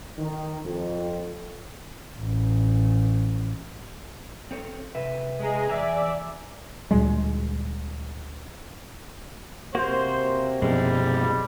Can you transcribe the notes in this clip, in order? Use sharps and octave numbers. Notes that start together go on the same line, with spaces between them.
D#3
F2
A1
C4 A4 C#5
C3 B4 E5
G#3 G#4 A#5
E2 D5 E5 G#5 A#5
D2 A#2 G3 G#3
C3 A#3 F#4 C5
F#2 B2 F3 G3 G#3